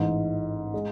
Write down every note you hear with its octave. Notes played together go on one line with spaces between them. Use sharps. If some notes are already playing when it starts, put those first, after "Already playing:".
Already playing: A1 G#2 E3
G#3